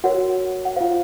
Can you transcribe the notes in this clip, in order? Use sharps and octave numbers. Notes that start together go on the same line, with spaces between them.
F#4 A#4 C#5 F#5
F#5
F4 C5 F5